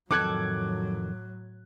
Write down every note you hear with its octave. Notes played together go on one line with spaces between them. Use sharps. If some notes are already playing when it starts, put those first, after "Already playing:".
F2 A2 D#3 F#3 A4 D6 F#6 G#6